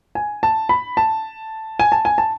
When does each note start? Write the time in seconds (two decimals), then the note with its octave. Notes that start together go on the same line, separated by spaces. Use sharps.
0.15 G#5
0.43 A5
0.69 B5
0.97 A5
1.79 G#5
1.92 A5
2.05 G#5
2.18 A5